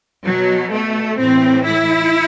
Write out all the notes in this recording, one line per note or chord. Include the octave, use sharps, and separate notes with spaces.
B2 F#3
A3
A2 E3 C4
E4